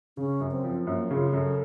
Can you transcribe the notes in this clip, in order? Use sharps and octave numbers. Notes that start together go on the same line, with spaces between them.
C#3 C#4
F#2
C4
F3
F#2 A#3
C#3 F4
F#2 A4